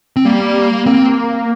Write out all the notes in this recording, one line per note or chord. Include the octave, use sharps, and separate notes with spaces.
C4
G3 A#3
A#3 C4